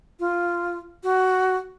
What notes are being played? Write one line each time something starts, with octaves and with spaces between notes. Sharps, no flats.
F4
F#4